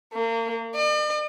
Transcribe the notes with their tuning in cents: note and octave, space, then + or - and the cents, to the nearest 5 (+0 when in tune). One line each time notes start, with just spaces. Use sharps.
A#3 -35
D5 +45